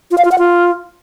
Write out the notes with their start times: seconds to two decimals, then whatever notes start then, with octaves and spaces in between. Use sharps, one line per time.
0.11 F4
0.18 F5
0.25 F4
0.32 F#5
0.38 F4